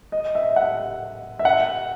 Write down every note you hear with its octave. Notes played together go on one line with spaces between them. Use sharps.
D#5
E5
F#5
E5
F#5